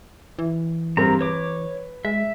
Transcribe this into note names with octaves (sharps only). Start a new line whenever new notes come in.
E3
G2 C4 A#4 A#5
B4 C#5 D6
G#3 E5